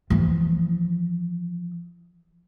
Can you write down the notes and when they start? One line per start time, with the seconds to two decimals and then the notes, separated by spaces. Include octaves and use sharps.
0.10 E3 F3